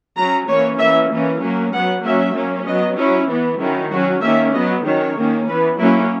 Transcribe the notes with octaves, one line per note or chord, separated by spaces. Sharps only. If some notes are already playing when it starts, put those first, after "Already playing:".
F#3 C#4 A#5
E3 A#3 C#4 C#5
E3 A#3 C#4 E5
E3 A#3 C#4
F#3 A#3 C#4
F#3 B3 F#5
F#3 A#3 C#4 E5
F#3 A#3 C#4
F#3 B3 D#5
F#3 C#4 E4
E3 B3
D#3 F#3 C#4 E4
F#3 C#4 F#4
D#3 A#3 C#4 E5
F#3 B3 D#5
D#3 F#3 C#4 C#5
D#3 A#3 C#4
E3 B3 B4
F#3 A#3 C#4 E4